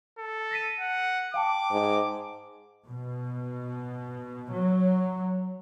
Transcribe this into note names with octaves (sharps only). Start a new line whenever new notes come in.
A4
A#6 B6 D#7
F#5
F5 G5 A5 D6
G#2
B2
F#3